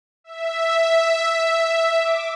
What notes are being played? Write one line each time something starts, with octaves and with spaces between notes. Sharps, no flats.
E5
D6